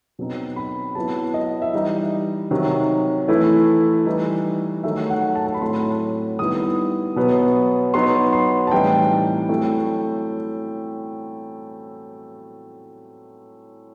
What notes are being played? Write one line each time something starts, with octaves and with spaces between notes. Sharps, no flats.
B2 F#3 C4 D#4
B5
F#3 B3 E4 A5
D#5
E5
E3 G3 D#4 D#5
C3 D#3 F#3
E3 A3 E4
E3 G3 D#4
D#3 F#3 A3 D#4 E5
F#5
A5
A5
B5
A2 F#3 A3 C4 C6
D#3 G3 B3 E4 D#6
B2 F#3 B3
F#3 B3 D#4 C6
C6
A5
A2 E3 G3 C4 D#4 G5
F#3 A3 C4 E4